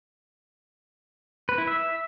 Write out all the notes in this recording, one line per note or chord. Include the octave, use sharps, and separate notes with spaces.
B4
E4
E5